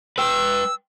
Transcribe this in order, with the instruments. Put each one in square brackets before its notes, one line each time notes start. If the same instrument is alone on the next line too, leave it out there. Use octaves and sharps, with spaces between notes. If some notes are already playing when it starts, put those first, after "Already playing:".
[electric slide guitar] B4 G5 [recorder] E6